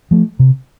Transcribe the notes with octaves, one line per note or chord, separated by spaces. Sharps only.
F3 A3
C3